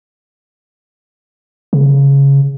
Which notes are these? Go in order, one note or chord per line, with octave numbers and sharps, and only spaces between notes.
C#3